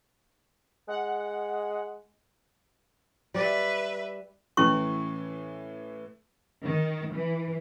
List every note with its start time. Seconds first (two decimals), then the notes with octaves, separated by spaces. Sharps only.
0.88 G#3 F#5
3.34 G3 B4 D5 E5
4.57 A2 E3 C#4 E4 C#6
6.64 D#3
7.14 E3